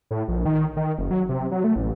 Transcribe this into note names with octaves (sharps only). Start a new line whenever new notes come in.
A2
A#1
D#3
D#3
F#1
F#3
C3
F#3
A3
A1